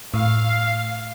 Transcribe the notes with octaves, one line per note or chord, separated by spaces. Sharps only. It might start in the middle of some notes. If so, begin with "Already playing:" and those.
A2 F5